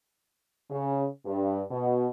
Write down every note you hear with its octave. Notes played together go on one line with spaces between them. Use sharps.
C#3
G2
B2